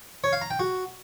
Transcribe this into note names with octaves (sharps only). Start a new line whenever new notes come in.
C#5
F5
A#5
G5
F#4